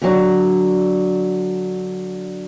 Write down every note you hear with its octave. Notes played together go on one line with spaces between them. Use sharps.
D3 F#3